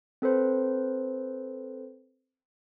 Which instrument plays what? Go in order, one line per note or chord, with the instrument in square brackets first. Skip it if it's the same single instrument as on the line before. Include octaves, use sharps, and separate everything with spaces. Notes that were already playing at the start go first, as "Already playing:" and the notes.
[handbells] C4 A4 B4 C5